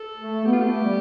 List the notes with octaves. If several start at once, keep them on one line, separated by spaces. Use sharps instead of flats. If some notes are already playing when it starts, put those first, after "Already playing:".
Already playing: A4
A3
B3 G4
F4
A3 G4
G3